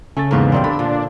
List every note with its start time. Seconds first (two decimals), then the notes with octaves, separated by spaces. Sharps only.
0.17 C#3 A3 E5 G#5 A6
0.31 E2 G#2 A#3 B3 C#6
0.52 A#1 F#2 C3 D#3 C4 D5
0.64 D3 D4 B5
0.79 A#2 D3 F3